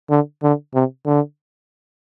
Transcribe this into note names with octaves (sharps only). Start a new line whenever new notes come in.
D3
D3
C3
D3